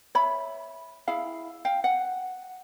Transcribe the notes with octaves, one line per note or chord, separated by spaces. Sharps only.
C#5 E5 B5
E4 G#4 F5
F5 G5
F#5